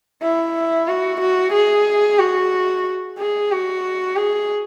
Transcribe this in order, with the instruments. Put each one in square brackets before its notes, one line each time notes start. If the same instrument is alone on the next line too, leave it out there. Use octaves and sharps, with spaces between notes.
[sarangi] E4
F#4
F#4
G#4
F#4
G#4
F#4
G#4